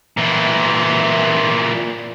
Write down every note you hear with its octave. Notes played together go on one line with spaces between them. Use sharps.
A#2 E3